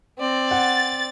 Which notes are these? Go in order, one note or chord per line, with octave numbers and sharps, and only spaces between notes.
C4 D5
F#5 A6